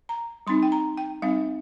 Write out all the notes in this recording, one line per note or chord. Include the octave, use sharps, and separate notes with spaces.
A#5
G3 C4 D#4 C6
G5
A#5
G5
G3 C4 D#4 F5